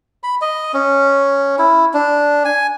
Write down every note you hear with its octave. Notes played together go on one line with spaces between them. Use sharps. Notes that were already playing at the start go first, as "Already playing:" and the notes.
B5
D#5
C#4
E4
D4
G#5